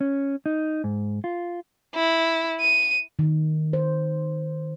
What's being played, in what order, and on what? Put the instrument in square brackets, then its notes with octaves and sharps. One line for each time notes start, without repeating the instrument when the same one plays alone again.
[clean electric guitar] C#4
D#4
G#2
F4
[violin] E4
D#7
[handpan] D#3
C5